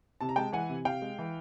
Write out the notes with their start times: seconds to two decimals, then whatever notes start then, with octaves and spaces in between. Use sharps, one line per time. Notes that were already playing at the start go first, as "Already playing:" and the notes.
0.21 C3 A5
0.29 A#5
0.36 G#3 G5 A5
0.52 E3 F#5 G#5
0.69 C3
0.85 C3 F5 G5
1.02 G#3
1.19 E3